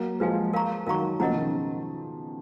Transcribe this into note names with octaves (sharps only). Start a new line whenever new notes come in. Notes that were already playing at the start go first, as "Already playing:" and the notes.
Already playing: F#3 A#3
F3 G#3 B4 F5 G#5
A#4 F5 A#5 C#6
D#3 F#3 A#4 F5 A#5 C#6
C#3 F3 A#4 D#5 F#5 A#5
B2 D#3
C#3